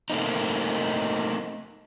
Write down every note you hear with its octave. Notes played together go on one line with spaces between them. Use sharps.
A3 A#3 C4 D#4